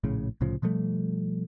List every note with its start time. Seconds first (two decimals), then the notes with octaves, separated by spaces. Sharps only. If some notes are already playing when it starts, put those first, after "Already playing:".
0.04 A#1 A2 C#3
0.41 C2 A2 C#3 F3
0.62 B2 F3 G3 A3